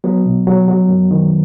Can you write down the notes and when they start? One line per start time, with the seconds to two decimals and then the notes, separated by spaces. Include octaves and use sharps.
0.04 F#3 B3
0.25 B2
0.47 F#3
0.68 F#3
0.88 F#2
1.11 D#3